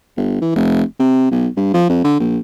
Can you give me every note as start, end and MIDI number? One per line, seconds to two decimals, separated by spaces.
0.17 0.39 31
0.41 0.51 52
0.55 0.83 29
1.00 1.31 48
1.31 1.47 35
1.57 1.69 43
1.74 1.86 53
1.90 2.03 41
2.04 2.16 50
2.20 2.38 34